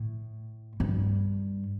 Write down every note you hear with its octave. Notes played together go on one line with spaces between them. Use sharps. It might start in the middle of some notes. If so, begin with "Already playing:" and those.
Already playing: A2
G2